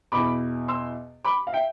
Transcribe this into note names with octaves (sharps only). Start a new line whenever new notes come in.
E2 B2 B5 D6
C6 E6
B5 D6
F5
E5 G5